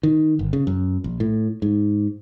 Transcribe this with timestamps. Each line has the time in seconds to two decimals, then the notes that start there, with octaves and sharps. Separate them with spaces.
0.03 D#3
0.39 G1
0.53 C#3
0.67 F#2
1.04 A#1
1.20 A2
1.62 G#2